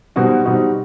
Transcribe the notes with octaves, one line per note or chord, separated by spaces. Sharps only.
B2 G3 C4 D#4 F#4
B2 G3 C4 D#4 F#4